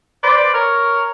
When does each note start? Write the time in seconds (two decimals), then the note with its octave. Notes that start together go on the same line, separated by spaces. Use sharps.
0.24 B4 C5 D5
0.54 A#4 C#5